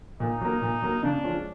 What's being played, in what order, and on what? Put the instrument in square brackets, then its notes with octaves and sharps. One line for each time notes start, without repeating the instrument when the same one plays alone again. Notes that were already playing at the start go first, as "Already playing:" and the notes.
[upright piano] A#2 [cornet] D#4
[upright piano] F#3 A#3
A#2
F#3 A#3
[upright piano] C#3 [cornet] D4
[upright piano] F3 G#3 C#4 F4